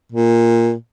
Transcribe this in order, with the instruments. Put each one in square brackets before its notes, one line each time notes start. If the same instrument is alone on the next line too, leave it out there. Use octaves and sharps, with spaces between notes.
[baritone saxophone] A#2